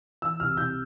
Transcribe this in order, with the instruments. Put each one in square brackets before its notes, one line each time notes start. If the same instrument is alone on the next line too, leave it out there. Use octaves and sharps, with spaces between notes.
[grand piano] E3 E6
C2 F6
C2 G6